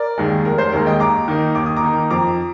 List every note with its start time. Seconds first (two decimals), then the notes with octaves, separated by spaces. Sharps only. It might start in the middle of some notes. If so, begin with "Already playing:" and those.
Already playing: A#4 D5
0.18 D#2 D#3 G#3
0.45 F1 A#4
0.58 C5
0.72 D#2 D#3 G#3 A#4
0.86 D#5 G5
1.00 D#2 A#5 D6
1.28 D#3 A#3 D#4
1.55 D#2 D6
1.66 D#6
1.77 A#5 D6
1.83 D#3 A#3 D#4
2.10 F2 A#5 D6